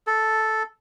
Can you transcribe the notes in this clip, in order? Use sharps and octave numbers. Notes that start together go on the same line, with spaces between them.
A4